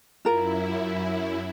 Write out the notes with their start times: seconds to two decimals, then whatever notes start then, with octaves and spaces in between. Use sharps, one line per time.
0.25 F#2 E4 F4 A#4